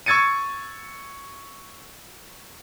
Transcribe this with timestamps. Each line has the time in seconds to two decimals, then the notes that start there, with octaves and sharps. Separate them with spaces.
0.06 C#6 E6 G#6 A6 C#7 D#7